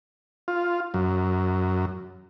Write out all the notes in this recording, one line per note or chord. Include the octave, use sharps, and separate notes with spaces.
F4
F#2